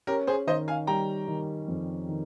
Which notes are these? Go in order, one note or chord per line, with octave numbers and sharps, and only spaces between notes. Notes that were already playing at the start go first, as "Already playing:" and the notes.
C#4 G4 A#4
G#4 C5
D#3 C5 D#5
F5 G#5
G3 G5 A#5
D#3
F2
D#3